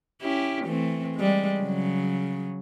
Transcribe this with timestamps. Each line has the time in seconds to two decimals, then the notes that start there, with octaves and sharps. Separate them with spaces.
0.22 C#4 E4 G4
0.65 E3 A3 C4
1.16 G3 G#3
1.60 C#3 F#3